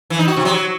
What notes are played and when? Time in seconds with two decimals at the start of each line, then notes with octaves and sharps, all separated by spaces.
0.10 E3
0.19 D#4
0.28 F#4
0.36 C3
0.45 F#3